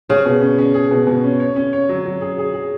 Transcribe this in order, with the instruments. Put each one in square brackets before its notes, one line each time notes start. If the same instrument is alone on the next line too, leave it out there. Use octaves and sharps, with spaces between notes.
[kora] C#3 [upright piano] G#4
[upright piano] B2
C#4
C#4
G#4
B2
B2
C#4
C#5
C#4
C#5
F#3
F#3
G#4
G#4
G#4